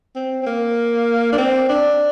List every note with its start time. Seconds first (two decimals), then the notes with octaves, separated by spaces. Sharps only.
0.16 C4
0.42 C4
0.46 A#3
1.33 D4
1.38 C4
1.69 D4